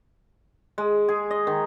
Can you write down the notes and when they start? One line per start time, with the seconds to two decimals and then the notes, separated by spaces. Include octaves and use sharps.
0.78 G#3
1.09 G#4
1.31 D#5
1.47 D#3